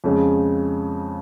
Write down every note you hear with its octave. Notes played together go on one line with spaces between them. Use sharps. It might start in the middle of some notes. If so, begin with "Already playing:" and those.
F2 C#3 G#3 C#4